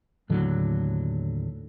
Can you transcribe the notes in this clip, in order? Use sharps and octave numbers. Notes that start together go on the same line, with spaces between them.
D#2 A2 D3 F#3